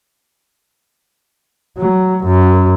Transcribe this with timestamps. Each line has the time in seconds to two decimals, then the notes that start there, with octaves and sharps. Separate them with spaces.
1.78 F#3
2.25 F#2